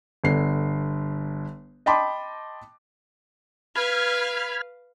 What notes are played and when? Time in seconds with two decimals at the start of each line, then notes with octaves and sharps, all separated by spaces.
0.24 G1 D3 C7
1.86 D#5 G5 A5 B5 C6 D6
3.75 B4 F5 B5 F6 G#6